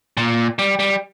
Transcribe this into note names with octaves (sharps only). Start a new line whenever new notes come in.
A#2
G3
G3